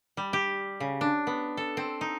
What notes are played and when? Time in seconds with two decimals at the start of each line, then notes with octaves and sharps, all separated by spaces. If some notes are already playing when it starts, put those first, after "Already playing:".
0.17 G3
0.33 G4
0.80 C#3
1.01 D4
1.27 B3
1.57 A4
1.77 C4
2.01 D#4